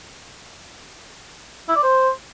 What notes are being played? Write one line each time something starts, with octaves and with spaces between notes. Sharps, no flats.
E4
D5
C5